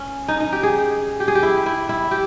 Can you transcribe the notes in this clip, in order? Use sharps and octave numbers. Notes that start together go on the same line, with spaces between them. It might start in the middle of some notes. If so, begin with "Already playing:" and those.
Already playing: C#4
D#4
D#4
G4
G#4
G4
G#4
G4
E4
E4
E4
G4